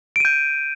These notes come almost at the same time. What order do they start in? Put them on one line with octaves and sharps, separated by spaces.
D7 D#7 G6